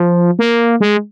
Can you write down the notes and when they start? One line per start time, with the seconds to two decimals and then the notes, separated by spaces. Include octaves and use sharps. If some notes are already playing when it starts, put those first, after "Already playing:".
Already playing: F3
0.39 A#3
0.80 G#3